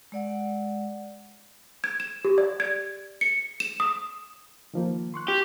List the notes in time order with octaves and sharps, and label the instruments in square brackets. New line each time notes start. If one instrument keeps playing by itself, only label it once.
[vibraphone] G#3 D5 F#5
[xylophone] G#6
E7
G4
D5
G#6
C#7
E7
D#6
[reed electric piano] D#3 F3 A#3
C6 C#6 F#6
[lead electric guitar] G4